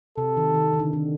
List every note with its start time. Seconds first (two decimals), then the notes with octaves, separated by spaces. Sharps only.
0.18 C3 A4
0.37 D#3
0.54 D#3
0.73 D#3
0.79 D3
0.93 D#3